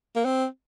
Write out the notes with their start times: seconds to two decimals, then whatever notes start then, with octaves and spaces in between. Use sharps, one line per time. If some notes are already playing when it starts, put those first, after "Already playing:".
0.16 A#3
0.25 C4